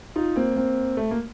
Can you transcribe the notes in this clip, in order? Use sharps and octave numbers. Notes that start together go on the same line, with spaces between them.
D#4 F4
A#3 C4
A#3 C4
A3
A#3